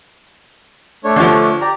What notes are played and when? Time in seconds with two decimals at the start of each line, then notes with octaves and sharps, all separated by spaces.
1.04 A3 D4 C#5
1.16 D3 F3
1.61 G4 D5 A#5